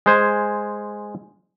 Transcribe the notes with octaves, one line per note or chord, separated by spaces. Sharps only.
G#3 C5 G#5